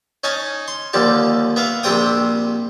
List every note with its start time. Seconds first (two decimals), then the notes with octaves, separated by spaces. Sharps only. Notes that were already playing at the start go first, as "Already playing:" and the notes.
0.24 C#4 D#4 G#5 A5
0.68 C6
0.93 D#2 D3 F3 G3 A5
1.56 B3 E5 F5
1.83 A#1 C3 G3 C5 G5 D#6